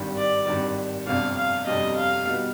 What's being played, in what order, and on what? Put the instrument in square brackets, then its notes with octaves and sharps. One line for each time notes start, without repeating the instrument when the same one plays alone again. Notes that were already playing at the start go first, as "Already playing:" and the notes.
Already playing: [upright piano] G#1 G2 D#3 G3
[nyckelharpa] D5
[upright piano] G#1 G2 D#3 G3
[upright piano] G1 F2 C3 G3 D4 [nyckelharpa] F5
[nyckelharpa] F5
[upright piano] G1 F2 C3 G3 D4 [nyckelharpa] D#5
[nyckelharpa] F5
[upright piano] B2 G3 B3 D#4